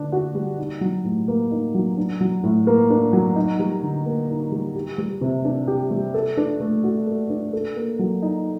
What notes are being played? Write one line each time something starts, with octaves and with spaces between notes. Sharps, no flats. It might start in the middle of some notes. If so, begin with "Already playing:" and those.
Already playing: D3 D4
F#4
G3
D#4
F#3
A2
A#3
D#4
F#3
D4
F#3
A2
A#3
D4
F#3
D#4
G3
D3
A#3
D#4
G3
G4
G3
C3
D4
G4
G3
A4
D4
A3
F#4
A4
D4
A4
A#3
F#3
D#4